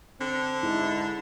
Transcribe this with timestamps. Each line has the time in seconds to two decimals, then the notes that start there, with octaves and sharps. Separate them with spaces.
0.20 D3 C4
0.63 G#2 E4